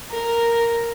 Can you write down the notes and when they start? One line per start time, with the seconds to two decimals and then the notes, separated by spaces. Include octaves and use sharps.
0.11 A#4